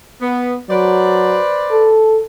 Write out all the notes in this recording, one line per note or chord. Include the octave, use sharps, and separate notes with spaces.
B3
F#3 B4 C5 D5
A4